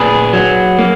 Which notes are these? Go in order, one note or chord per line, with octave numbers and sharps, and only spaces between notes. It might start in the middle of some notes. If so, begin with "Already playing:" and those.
Already playing: A#2 G#4 B4
F#3
A#3